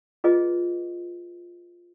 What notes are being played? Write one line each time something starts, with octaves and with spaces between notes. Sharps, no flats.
F4 G#4 B4 D#5